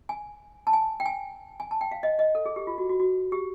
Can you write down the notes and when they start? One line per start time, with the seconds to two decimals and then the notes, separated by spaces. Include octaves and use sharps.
0.09 G#5
0.67 A5
0.73 G#5
1.00 G5
1.06 G#5
1.60 G#5
1.71 A5
1.81 G5
1.91 F5
2.03 D#5
2.19 D#5
2.35 A4
2.45 G#4
2.56 G4
2.67 F4
2.78 F#4
2.89 F#4
3.00 F#4
3.32 G4